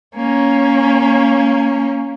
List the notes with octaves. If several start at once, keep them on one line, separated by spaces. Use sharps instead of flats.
A#3 C#4